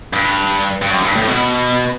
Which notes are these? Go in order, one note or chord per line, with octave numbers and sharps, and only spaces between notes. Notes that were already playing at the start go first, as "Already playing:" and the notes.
G2
G2
F#2
G2
A2
B2